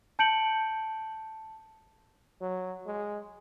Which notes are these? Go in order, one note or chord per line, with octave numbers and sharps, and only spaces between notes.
A5 G6 C#7 D7 F#7
F#3
G#3